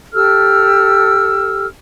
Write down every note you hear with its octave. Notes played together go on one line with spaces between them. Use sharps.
G4 A4 E6 F6